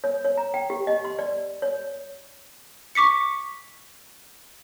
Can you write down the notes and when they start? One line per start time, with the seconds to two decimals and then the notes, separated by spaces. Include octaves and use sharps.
0.04 C#5
0.25 C#5
0.37 A#5
0.54 G5
0.70 G4
0.87 D#5
1.05 C6
1.19 D5
1.62 C#5
2.95 C#6 D6 B6 C#7